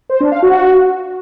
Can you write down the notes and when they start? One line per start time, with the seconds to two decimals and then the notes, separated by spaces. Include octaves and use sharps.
0.10 C5
0.21 D4
0.32 F5
0.43 F#4